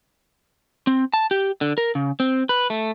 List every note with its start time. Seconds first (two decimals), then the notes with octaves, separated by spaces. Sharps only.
0.87 C4
1.14 A5
1.31 G4
1.61 D3
1.78 A#4
1.95 C#3
2.20 C4
2.49 B4
2.70 A3